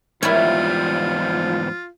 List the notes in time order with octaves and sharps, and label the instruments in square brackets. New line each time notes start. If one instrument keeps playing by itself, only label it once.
[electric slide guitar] E2 G#2 G3 [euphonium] F3 [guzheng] E4 C#5 [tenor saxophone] F4